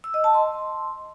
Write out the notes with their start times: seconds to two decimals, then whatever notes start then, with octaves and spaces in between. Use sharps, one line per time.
0.04 E6
0.14 D#5
0.24 A5
0.34 C6